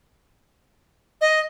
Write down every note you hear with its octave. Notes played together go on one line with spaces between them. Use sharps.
D#5